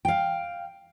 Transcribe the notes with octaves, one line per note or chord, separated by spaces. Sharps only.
F5 G5